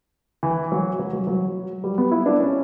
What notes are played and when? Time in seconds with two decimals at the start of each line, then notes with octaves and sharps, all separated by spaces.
0.43 E3
0.72 F#3
0.99 F#3
1.13 F#3
1.27 F#3
1.84 G3
1.98 B3
2.11 E4
2.26 D4
2.40 C#4